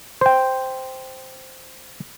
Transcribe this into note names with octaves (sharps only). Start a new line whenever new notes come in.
C5 G5